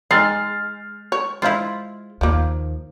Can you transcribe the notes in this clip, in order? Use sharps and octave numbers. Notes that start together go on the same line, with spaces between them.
G#3 D#4 F6 A6 C7
C#5
G#3 E4 F4 C5 F5
D#2 F3 A#3